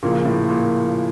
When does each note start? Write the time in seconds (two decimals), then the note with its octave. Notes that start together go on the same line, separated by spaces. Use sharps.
0.03 A#2 C#3 F3 A#3
0.25 A2
0.49 A#2